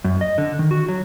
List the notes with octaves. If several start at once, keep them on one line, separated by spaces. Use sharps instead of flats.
F#2
D#5
D3
D#3
F#4
F#3